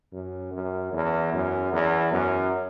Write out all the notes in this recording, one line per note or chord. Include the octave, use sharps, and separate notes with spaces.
F#2
F#2
E2
F#2
E2
F#2